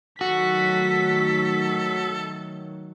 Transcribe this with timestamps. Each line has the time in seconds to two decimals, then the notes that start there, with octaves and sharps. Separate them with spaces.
0.21 D#3 F#3 A3 F#4 A4 B6